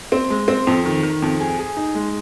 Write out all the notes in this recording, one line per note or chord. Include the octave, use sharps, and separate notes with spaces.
C4
G#3
C4
F2
D#3
D#3
F2
G#4
G#4
D#4
G#3